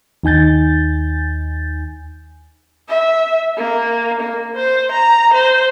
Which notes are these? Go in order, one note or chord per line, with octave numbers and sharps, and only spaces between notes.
D#2 D#4 G#5 G6 A6
E5
A#3
A#3
C5
A#5
C5